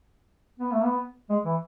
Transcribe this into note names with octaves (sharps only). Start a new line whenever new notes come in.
B3
A3
B3
G#3
E3